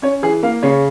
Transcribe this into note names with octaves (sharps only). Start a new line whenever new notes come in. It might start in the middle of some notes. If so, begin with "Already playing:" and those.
C#4 C#5
E3 G#4
A#3 F5
C#3 C#5